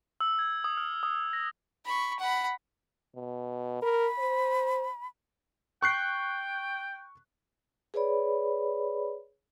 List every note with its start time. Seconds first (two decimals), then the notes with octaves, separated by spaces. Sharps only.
0.20 E6
0.39 G#6
0.64 D#6
0.77 F6
1.03 D#6
1.33 A#6
1.85 B5 C#6
2.19 F#5 B5
3.16 B2
3.82 A#4 B5
4.19 C5
5.82 G5 C#6 F#6 C7
7.94 G#4 B4 C#5 D5 B5